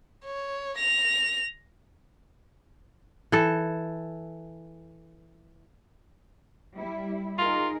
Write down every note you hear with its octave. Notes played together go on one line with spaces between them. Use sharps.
C#5
A#6 F7
E3 A4
G3 E4
D#4 F4 G#4 A#4